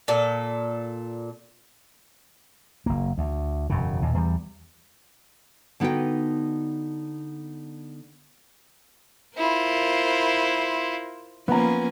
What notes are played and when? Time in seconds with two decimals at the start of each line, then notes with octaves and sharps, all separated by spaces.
0.08 A#2 A4
2.86 F#1 A#3
3.18 D2
3.70 E1 F#2 C#3
4.02 D#2 A#2
4.14 E2 D#3 G3
5.80 D3 B3 D#4 F#4 G5
9.37 E4 F4 A#4 C5
11.48 F3 A#3 B3 C#4 A#5